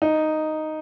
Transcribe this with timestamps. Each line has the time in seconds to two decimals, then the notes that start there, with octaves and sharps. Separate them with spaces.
0.02 D#4